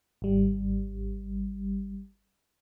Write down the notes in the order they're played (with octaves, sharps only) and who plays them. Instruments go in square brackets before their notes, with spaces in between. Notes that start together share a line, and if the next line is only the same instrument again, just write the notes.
[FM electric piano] G#1 G3